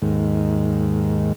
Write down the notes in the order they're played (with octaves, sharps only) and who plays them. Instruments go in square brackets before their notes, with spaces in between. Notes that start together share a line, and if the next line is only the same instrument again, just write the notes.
[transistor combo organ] D#2 G#2